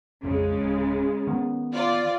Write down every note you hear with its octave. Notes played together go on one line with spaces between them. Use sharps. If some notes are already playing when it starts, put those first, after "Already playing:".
A#1 F2 C#3 G#3
D1
D#3 B3
F4 D5